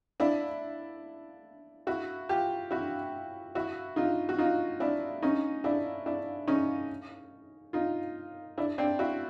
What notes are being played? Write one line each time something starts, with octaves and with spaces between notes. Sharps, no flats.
D4 E4
E4 F#4
F4 G4
E4 F#4
E4 F#4
D#4 F4
F#4
D#4 F4
D4 E4
C#4 D#4
D4 E4
D4 E4
C#4 D#4
D#4 F4
D4 E4
C4 D4
E4 F#4